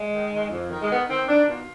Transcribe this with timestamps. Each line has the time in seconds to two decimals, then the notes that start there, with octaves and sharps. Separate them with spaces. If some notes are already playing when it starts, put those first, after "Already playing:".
Already playing: G#3
0.11 D#3
0.30 D#3
0.50 F2
0.70 D#3
0.81 G#3
0.89 D#3 B3
1.09 D#3 C4
1.28 D#3 D4
1.48 B2 F4